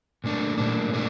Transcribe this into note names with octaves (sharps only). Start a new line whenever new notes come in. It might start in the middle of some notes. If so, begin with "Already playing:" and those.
A#2 A3 D4
A#2 A3 D4
A#2 A3 D4